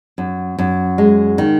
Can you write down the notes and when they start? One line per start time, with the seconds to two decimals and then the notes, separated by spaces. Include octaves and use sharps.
0.18 F#2
0.59 F#2
0.98 G#3
1.38 D#3